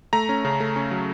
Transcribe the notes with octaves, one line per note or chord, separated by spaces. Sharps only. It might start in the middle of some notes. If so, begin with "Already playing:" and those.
A3 A#5
C#4
C#3
A3
C#4
F#3